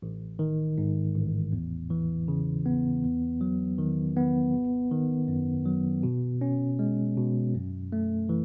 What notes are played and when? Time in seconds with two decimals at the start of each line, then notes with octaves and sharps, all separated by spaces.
0.02 A1
0.39 D#3
0.78 G#2
1.14 A1
1.52 E2
1.90 E3
2.28 C#3
2.66 B3
3.03 E2
3.41 F#3
3.78 D#3
4.16 B3
4.54 G#1
4.91 D#3
5.28 F#2
5.66 F#3
6.03 B2
6.41 C#4
6.79 G#3
7.17 B2
7.55 F#2
7.92 A3
8.29 E3